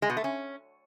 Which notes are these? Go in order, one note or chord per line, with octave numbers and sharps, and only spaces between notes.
G#3
B2
A3
C#4